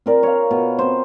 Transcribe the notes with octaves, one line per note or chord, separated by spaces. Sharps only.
C4 A#4 D5
C#5 F5
B2
C4 C5